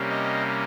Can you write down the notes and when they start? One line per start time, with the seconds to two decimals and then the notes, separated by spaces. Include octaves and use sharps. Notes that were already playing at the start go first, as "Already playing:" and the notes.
Already playing: C3 G3 A#3 C#4
0.09 D#5